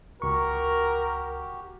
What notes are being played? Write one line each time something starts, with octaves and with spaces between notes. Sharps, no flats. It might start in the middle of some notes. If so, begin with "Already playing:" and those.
C#2 F#4 G4 A#4 C#6